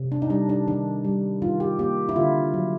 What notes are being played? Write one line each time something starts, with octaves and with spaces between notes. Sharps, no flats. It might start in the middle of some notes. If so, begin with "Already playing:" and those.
Already playing: C3
D4
D#4
G3 D4
D4
D#3 D4
G3
D#3 F4
G4
A#3 G4
E4
D3 F4
F#3